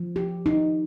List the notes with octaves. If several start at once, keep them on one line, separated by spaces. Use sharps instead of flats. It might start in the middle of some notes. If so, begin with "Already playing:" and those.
Already playing: F3
G4
D#4